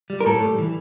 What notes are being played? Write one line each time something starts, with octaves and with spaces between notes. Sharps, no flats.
G3
A#4
A2 A4
G3
E3